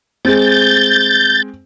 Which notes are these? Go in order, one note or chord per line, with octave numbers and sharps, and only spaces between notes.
G#3 C4 G6 A6